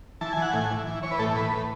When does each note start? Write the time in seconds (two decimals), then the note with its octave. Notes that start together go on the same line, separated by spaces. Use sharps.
0.21 E3 A5
0.32 G#5
0.37 E3 F#5
0.53 A2 G#5
0.71 E3
0.87 E3
1.03 E3 C#5
1.11 B4
1.19 A2 A4
1.35 A2 B4
1.51 A2